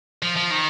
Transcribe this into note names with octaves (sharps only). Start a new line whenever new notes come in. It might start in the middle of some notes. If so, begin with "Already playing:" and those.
F3
F3
D#3